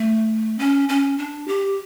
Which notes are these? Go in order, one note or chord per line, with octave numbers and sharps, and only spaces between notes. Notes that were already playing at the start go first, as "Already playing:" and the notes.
Already playing: A3
C#4
C#4
D4
G4